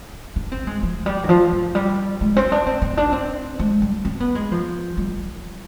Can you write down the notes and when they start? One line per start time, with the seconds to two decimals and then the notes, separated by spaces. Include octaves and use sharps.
0.36 D4
0.52 C4
0.67 G#3
0.83 F3
1.06 G3
1.24 D#3
1.29 F3
1.52 F3
1.75 G3
2.21 G#3
2.37 C4
2.52 D4
2.66 C4
2.82 C4
2.97 D4
3.12 C4
3.59 G#3
3.82 G3
4.05 C4
4.20 B3
4.35 G#3
4.52 F3
4.97 G3